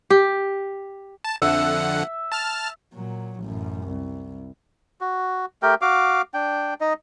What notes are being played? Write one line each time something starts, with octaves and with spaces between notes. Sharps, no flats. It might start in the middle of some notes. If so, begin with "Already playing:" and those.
G4
A5
F2 D3 E5 F#5
A5 F6
A#2 F#3
A1 F#2
C2
F#4
A3 G4 A#4 G5
F#4 F5 D6
D4 G5
D#4 D#5